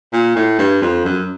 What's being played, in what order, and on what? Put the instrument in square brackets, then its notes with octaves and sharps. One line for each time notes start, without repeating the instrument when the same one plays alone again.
[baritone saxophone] A#2
A2
G2
F2
F#2